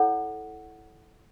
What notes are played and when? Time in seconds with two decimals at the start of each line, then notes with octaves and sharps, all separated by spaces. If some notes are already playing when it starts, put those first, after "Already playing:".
Already playing: E4 A4 C#5 F#5